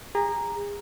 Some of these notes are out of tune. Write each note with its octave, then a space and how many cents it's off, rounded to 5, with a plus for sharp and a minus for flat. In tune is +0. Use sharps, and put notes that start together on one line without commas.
G#4 -35 A#5 +0